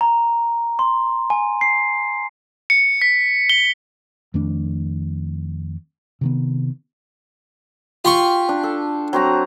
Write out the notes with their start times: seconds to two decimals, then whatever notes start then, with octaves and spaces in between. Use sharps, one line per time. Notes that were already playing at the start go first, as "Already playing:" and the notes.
0.01 A#5
0.79 C6
1.30 G#5
1.61 C7
2.70 C#7
3.02 B6
3.50 G7
4.34 F2 D#3 A3 D4
6.21 C3 D#3 B3
8.05 F4 G4 C6 C#6
8.49 D4
8.63 A4
9.13 F#3 C4 A#5